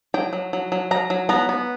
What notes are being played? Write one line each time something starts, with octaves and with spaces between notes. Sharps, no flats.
F#3 G5
F#3
F#3
F#3
F#3 A#5
F#3
B3 A#5
B3